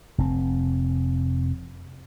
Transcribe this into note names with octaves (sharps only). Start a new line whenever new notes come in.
F1 C4